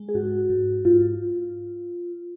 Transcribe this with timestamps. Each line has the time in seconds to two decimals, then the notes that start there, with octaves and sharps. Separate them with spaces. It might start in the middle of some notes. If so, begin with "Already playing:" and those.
Already playing: G#3
0.09 G#4
0.15 G#2 F#4
0.50 G#2
0.85 G#2 F4